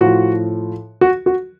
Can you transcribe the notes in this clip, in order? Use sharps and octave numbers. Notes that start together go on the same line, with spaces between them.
A2 F3 F#4
F#4
F#4